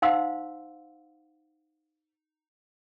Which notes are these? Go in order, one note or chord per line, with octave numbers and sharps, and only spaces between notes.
D#4 C5 F5 F#5 C6 E6